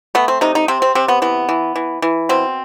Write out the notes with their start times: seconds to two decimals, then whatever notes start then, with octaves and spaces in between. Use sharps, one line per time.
0.15 A3 B3
0.28 C4
0.41 C3 D#4
0.55 D#4
0.68 C3 C4
0.82 C4
0.95 C3 C4
1.08 B3
1.22 E3 B3
1.49 E3
1.76 E3
2.02 E3
2.29 B2 C4